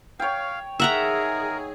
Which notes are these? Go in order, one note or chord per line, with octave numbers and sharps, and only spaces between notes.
C#5 F5 G5
D#4 G#4 A#4 E5 F#5 A#5